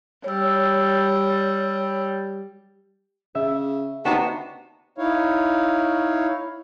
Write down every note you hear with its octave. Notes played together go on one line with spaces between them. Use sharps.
G3 C#5 E6
C#3 E5
D#2 B3 C4 D4 D#4 F#4 A5
D#4 E4 C#5 F5